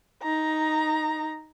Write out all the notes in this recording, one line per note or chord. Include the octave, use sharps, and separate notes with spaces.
D#4 A#5